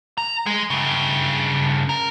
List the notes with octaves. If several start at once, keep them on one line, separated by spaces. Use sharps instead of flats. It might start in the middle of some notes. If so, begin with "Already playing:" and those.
A#5
G#3 G#4
G2 C#3
A#4